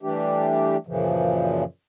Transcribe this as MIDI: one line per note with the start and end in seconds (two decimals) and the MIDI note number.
0.03 0.77 52
0.03 0.77 55
0.03 0.77 57
0.03 0.77 62
0.03 0.77 67
0.87 1.64 42
0.87 1.64 46
0.87 1.64 49
0.87 1.64 52
0.87 1.64 53